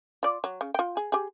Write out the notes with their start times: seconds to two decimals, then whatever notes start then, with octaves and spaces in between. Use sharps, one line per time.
0.23 F4 D5
0.44 F#3
0.61 C#3
0.74 F4 G5
0.97 G#4
1.12 G4 G#4